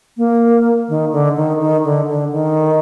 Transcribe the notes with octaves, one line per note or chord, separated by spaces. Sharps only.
A#3
D#3
D3
D#3
D#3
D3
D3
D#3